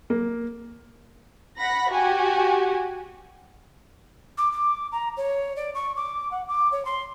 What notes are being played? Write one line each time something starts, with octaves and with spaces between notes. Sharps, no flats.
A#3
F#5 B5 A#6
F#4 G4 G#5
D6
D6
A#5
C#5
D5
C#6
D6
F#5
D6
C#5
C6